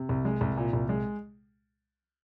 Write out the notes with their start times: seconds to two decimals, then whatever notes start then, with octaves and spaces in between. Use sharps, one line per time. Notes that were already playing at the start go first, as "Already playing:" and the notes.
Already playing: C3
0.09 C2
0.25 G#3
0.41 C2
0.57 A#2
0.73 C2
0.89 G#3